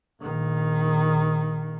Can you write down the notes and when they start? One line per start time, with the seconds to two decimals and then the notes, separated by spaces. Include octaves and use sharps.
0.22 A#1 D#3